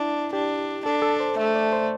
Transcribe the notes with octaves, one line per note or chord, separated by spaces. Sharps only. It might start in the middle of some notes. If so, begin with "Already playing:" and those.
Already playing: D4 E4
D4 G4
D4 A4
A4
C5
A3 E5
D5
C5